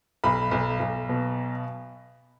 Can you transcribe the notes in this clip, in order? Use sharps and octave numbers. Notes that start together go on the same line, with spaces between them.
B1 B5
B1
B1
B2